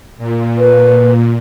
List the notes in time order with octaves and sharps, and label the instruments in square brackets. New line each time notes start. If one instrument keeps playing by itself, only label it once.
[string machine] A#2
[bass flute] B4